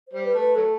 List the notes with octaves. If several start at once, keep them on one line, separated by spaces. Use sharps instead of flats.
C5
G3
B4
A3
B4
F#3 A3 A4